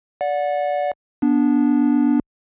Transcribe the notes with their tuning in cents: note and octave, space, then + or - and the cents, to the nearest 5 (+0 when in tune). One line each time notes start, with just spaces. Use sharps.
D5 -15 F#5 -25
B3 -20 D4 -10